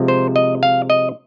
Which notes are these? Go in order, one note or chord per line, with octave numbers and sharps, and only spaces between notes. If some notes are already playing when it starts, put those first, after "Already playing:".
Already playing: C3 F3 G#3
C5
D#5
F5
D#5